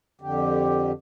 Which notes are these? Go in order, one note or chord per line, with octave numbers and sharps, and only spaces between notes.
F2 D3 G4